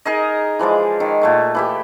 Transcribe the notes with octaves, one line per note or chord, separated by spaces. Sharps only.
D#4 G#4 A#4 D#5
E3 F3 G#3 D5
D#3
A#2 A3 C#6
E3 E4 G4